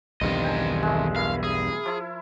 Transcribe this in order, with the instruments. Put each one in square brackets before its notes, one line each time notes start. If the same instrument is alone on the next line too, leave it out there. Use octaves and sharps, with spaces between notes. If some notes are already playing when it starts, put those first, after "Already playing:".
[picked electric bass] B1 E2 G2 [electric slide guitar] D#3 C4 D#5
[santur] G5 G#5 A#5
G#3 A3
[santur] E4 A#4 [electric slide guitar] F5
[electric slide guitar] G#4
[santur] F3 E4